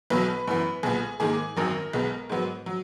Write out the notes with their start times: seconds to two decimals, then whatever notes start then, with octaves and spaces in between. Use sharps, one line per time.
0.10 B1 B2 F#3 B4
0.48 F#2 E3 B3
0.83 B1 A#2 G#3 B3 G#4
1.20 G#2 D#3 A#3 G#4
1.57 G#1 F#2 D#3 F#3 A#4
1.93 B1 B2 G#3 B3
2.29 G#2 F#3 B3
2.66 F#3